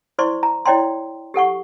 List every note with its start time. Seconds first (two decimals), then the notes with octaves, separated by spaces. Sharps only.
0.18 E4 C5 D5 C6 C#6
0.43 A#5
0.65 E4 C#5 D5 G5 A#5 C6
1.34 G4 A4 F#5 C#6